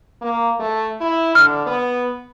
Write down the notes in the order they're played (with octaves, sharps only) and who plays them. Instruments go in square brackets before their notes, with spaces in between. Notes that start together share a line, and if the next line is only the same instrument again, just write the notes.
[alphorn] A#3
A3
E4
[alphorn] D3 [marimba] F6
[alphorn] B3